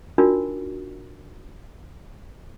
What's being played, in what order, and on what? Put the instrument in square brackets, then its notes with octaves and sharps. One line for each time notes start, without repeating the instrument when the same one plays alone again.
[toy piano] D4 D#4 F4 F#4 A#4 D5